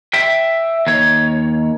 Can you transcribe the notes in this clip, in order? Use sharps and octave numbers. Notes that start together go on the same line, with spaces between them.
E5 G5
D#2 C#5